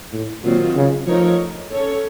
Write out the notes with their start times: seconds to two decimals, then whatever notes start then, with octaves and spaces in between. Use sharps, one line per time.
0.13 A2
0.44 A#2 D#3 F#3 C4 F4
0.76 C#3
1.07 F3 A3 D#4 A#4 C#5
1.71 C#4 A4 C#5